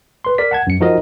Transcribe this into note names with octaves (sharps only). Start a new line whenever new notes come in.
B4 C6
A#4 D5 B6
F#5 A5 G#6
F#2 C#7
F3 D#4 F#4 A#4 D#5